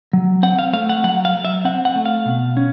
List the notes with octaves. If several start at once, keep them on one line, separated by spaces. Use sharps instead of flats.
F#3
C4 F#5
F5
A3 F5
F#5
F#3 F#5
F5
F#3
E5
C4 F#5
F#5
A3
F5
B2
C#4